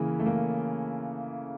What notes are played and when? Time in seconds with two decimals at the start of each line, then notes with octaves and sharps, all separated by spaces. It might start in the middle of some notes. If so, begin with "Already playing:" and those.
Already playing: C#3 E3 A#3
0.19 A3
0.26 A#3